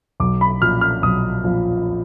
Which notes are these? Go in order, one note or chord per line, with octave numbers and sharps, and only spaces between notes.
B1 D6
B5
A#2 F3 F6
F6
B1 D#6
A#2 F3